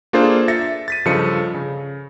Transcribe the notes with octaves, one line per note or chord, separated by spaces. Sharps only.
A#3 D4 F4 G#4 A4 C5
E5 A6 A#6 C#7
A6 B6 D#7
G2 C#3 F3 A4 D#5 C#7
C#3